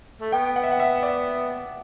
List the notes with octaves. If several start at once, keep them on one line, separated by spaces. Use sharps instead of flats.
A3
B3 G5
F#5
E5
F#5
E5
D5